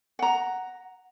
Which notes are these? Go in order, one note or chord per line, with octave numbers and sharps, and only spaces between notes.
F#5 A#5